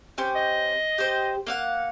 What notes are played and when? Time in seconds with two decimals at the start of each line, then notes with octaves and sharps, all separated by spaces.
0.18 C#4 G4 C5
0.36 D#5
0.98 G4 C5
1.47 A#3 F5 F#5